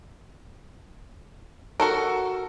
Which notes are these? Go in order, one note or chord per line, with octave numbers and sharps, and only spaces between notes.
F#4 A4 A#4